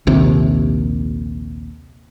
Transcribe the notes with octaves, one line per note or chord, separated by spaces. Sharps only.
A#1 D#2 C3